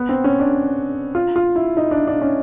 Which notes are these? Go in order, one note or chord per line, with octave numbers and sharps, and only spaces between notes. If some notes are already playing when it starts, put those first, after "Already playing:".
Already playing: B3
C4
C#4
D4
F4
F4
E4
D#4
D4
D4
C#4